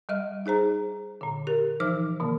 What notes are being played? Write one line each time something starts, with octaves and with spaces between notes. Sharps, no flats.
G3 D#5 E5 F6
D#4 G#4 C5 A#5
A#2 D3
G4 A#4
E3 F3 D#4 C5 D6 F6
B2 D#3 A#3